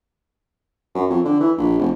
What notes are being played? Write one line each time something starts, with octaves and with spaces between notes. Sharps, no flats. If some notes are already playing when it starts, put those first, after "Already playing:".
F#2
F2
D3
E3
A#1
F1